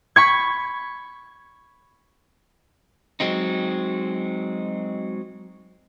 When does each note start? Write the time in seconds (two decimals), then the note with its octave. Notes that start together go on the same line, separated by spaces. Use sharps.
0.16 B5 C#6 G#6
3.20 F#3 G#3 C4 D#4